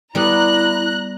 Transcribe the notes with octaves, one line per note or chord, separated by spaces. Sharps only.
G3 B3 E4 A#5 F#6